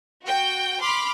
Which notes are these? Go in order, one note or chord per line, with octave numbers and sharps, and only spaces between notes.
F#4 G5
B5 C6 D6 F6